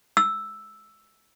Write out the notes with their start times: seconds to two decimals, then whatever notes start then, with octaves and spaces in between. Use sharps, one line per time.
0.17 E6